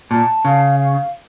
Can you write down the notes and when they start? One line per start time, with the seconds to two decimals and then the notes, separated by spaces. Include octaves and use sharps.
0.11 A#2 A5
0.45 C#3 F5
0.79 F5